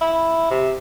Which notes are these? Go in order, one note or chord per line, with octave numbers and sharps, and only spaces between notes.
E4
C3